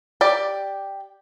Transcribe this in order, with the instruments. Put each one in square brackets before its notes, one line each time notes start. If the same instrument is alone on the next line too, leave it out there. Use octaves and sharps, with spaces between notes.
[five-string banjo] G4 D5